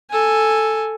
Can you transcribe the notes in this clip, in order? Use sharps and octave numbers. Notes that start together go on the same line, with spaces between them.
A4 G#5